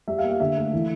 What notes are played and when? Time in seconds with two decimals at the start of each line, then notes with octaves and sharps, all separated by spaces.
0.08 G3 E5
0.18 F5
0.24 A#3
0.29 F5
0.40 D3 E5
0.56 A3
0.73 E3